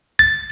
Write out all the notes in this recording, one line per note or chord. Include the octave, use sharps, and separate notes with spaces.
A6